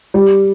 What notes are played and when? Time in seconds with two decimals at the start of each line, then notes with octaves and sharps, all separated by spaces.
0.14 G3